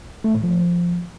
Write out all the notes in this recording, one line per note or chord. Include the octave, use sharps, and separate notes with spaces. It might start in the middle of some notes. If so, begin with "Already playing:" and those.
A3
A2
F3